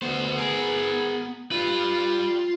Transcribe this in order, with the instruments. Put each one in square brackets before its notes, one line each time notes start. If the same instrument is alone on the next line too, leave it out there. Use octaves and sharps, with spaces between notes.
[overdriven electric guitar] D2 C5 [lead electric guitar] B3
[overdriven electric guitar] G#4 A#4
[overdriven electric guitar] G3 B4 [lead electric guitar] F4